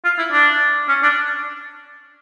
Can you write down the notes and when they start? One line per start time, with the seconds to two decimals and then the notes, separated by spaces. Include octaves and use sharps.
0.04 F4
0.18 E4
0.32 D4
0.89 C#4
1.03 D4